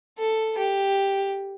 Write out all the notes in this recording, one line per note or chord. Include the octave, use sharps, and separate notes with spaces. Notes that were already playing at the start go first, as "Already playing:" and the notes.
A4
G4